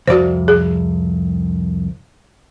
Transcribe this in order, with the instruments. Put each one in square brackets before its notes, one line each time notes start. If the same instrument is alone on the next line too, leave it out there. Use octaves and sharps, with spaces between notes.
[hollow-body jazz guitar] C2 F2 D5 [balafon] F#4 C5
[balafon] G#4